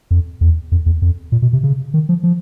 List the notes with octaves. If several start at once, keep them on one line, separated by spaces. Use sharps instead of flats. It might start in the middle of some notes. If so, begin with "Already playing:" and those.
F2
E2
F2
E2
F2
A#2
B2
C3
C#3
D#3
F3
F3